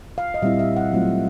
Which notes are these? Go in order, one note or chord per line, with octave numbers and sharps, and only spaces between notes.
F5
D#5
A#2 G3 C4 E4 E5
E5
F#5
F#3 A3 C4 F4